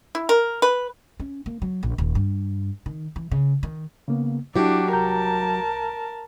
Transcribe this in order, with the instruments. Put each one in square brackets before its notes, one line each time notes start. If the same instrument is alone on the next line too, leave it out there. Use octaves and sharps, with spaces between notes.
[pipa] E4
A#4
B4
[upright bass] C#4
A#3
F#3
A#1
D#1
G2
D#3
E3
C#3
D#3
[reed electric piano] C#3 A#3 B3
[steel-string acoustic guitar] F#3 G4 [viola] D4 [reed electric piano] E4
[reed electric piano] C2 A#5 G6 [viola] A#4 A5